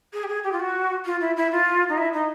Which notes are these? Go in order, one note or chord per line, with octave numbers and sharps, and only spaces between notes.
G#4
G4
G#4
G4
F4
F#4
F4
E4
E4
F4
D#4
E4
D#4